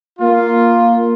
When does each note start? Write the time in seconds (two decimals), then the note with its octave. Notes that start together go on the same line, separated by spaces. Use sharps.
0.19 A#3 F4